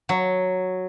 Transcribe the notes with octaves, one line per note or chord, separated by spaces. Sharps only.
F#3